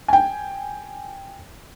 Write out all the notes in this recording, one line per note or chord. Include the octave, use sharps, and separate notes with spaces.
G5 G#5